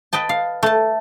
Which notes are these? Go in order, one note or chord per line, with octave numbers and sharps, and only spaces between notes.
B4 D#5 G5 A5
F5
A3 A5